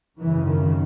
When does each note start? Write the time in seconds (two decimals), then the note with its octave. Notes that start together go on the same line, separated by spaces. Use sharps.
0.19 G#1 F#2 C#3 E3
0.48 D#3